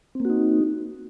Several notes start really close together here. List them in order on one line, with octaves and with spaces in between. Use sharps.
C4 A#3 F#4 D#4